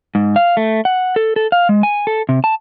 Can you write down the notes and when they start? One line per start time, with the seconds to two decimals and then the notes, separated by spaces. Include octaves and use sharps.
0.15 G#2
0.36 F5
0.57 A3
0.85 F#5
1.16 A4
1.36 A4
1.52 F5
1.69 G#3
1.83 G#5
2.07 A4
2.29 C3
2.44 A5